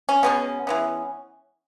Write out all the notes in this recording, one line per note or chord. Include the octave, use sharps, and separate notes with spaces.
C#4
B2 G#3 B3
E3 G#3 B3